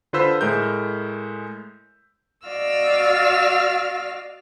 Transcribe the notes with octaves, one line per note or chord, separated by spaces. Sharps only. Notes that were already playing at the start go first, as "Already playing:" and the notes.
D3 F4 B4 C5 E6 B6
A2 G#3 A#4 G6
F#4 D5 D#5 F5 E6 F6